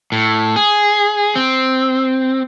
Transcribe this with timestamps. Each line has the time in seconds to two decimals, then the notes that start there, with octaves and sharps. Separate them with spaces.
0.12 A2
0.56 G#4
1.35 C4